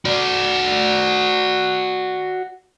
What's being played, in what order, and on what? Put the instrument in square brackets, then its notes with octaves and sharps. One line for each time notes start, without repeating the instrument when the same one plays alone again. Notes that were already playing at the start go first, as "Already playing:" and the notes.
[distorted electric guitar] F#4 D5